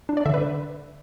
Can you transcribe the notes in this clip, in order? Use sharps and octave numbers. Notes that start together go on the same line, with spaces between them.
D4
D5
D3 E5
B4